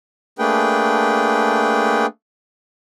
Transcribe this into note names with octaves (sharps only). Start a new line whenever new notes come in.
A3 A#3 D4 G#4 B4 G5